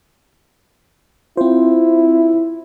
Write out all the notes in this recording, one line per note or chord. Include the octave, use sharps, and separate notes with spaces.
C4 E4 F4 C5